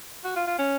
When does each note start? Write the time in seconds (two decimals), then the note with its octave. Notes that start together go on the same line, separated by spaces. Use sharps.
0.24 F#4
0.36 F4
0.47 F4
0.59 C#4